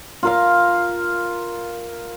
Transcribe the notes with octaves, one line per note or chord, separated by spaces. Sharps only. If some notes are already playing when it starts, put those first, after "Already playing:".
F4 A#4 F5